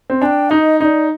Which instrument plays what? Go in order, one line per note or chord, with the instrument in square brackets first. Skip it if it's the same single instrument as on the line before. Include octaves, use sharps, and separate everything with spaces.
[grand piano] C4
[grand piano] D4 [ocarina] G5 G#5
[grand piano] D#4 [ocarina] D#5
[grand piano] D#4 [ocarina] D5 D#5